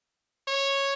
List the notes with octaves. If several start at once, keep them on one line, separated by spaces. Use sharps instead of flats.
C#5